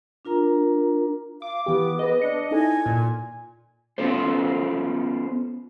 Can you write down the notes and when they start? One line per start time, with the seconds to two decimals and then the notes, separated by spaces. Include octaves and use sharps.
0.25 D4 F4 A#4 A#5
1.42 F5 D6
1.66 E3 B3 G4
1.99 G#4 B4 D#5
2.22 D4 C#7
2.51 D#4 E4 A4 G#5
2.86 A#2
3.98 B3 C#4 F4 A4 C5